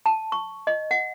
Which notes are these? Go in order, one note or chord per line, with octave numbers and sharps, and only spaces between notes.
A5
C#6
D#5
F#5